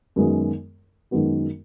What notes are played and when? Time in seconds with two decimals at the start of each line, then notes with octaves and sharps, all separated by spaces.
0.16 F#2 D#3 G#3 B3 F#4
1.11 F#2 D#3 G#3 B3 F#4